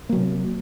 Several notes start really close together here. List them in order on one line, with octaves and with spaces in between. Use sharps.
A#3 F#3 C3